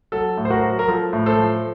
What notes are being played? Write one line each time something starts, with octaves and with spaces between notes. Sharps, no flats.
F#3 A4
A2
C5
F#4 A#4
F#3
A#4
F3 A4
A2
A4 C5
F3